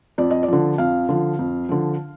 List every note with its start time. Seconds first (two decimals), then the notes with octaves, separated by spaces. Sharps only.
0.18 F2 D5
0.31 D#5
0.43 D5
0.48 D3 F3
0.78 F2 F5
1.09 D3 F3
1.39 F2
1.69 D3 F3